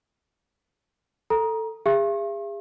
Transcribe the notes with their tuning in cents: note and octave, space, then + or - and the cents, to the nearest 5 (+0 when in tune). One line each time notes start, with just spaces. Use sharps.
A4 +10 A#5 +20
G#4 -40 E5 +45 C#6 -45